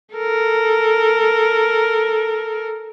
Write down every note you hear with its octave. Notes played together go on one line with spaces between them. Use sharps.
A4 A#4